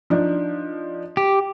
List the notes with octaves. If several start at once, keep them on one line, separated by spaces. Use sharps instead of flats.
F3 D4 D#4
G4